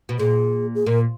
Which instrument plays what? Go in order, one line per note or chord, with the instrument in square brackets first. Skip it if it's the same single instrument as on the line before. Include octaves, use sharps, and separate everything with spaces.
[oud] B2
[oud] A#2 [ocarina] G#4
[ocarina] G#4
[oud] A#2 [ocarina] A#4